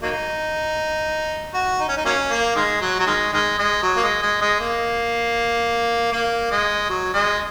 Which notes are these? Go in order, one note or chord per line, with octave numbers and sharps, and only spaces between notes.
F#3 A#3 D#4
F#4
D#4
C#4
D#4
F#3 A#3 C#4
A#3
D#3 G#3
F#3
F#3
D#3 G#3
D#3 G#3
G#3
F#3
A#3
G#3
G#3
G#3
A#3
A#3
G#3
F#3
G#3